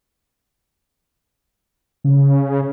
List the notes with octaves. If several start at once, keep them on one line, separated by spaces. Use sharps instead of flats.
C#3